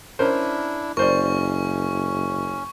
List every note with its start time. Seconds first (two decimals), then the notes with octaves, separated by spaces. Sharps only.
0.19 C#4 D4 E4 A#4 C5
0.97 F#1 C#4 A#4 C5 D5 C#6